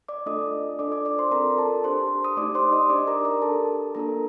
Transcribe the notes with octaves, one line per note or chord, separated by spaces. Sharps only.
D5 D6
A3 D4 F4 A4 D#5 D#6
D4 F4 A4 D5 D6
D5 D6
D5 D6
C5 C6
C4 F4 A4 A#4 A#5
A4 A5
D4 G4 C5 C6
D#6
A3 D#4 G4 D5 D6
C5 C6
D#5 D#6
D4 G4 D5 D6
A#4 A#5
A#4 A#5
D4 G4 A4 A5
A#3 D4 F4 A4 A#4 A#5